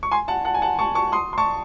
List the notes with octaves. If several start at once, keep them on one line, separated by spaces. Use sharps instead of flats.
C#6
G#5 C6
F#5 A5
F#5 A5
G#5
F#5 A5
A5 C#6
A5 C#6
C6 D#6
C6
A5 C#6